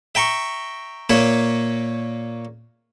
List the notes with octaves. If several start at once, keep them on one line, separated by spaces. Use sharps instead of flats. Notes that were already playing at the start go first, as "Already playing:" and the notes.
E5 G5 A#5 C#6
A#2 A#3 C#5 E5